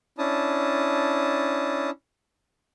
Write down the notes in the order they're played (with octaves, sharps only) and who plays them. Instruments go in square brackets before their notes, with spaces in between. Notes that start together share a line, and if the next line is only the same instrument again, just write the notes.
[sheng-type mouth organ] C#4 D4 E4 A5 D#6